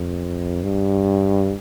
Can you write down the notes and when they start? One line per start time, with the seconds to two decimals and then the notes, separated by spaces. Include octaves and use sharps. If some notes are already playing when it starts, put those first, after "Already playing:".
Already playing: F2
0.63 G2